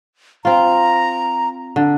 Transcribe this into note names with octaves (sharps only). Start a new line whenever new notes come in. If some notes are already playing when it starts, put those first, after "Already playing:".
C4 F4 A#5
D3